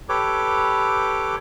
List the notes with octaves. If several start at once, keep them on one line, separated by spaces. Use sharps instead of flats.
G4 A4 B4 C#5 D6